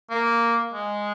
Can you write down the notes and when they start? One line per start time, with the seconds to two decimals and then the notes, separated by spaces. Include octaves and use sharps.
0.10 A#3
0.74 G#3